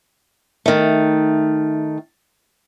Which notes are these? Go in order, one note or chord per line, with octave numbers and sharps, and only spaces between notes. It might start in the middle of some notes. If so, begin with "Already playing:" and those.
D#3 A3